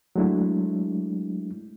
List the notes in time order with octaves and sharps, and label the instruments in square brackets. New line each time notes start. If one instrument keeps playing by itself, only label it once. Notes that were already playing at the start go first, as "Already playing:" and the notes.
[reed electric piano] F#3 G#3 A3 D4 E4